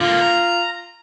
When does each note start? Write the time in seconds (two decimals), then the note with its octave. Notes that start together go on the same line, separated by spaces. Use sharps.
0.01 D3 A#3 F4
0.22 A#5